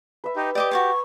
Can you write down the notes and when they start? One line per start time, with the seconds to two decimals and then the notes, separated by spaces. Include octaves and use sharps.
0.24 B4 E5
0.36 D#4 G4
0.55 G4 D5 D#5 D6
0.71 F#4 G#4 A5 C#6